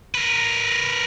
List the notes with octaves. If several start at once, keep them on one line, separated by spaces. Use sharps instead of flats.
A#4 B4